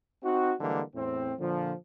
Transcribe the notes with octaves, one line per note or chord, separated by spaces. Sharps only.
C4 D#4 F#4
D3 E3 G3 G#3 A#3
E2 A2 C4
A#2 D3 F3